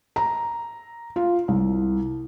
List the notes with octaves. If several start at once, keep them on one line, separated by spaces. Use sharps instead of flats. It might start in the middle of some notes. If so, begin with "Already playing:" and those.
A#5
F4
C2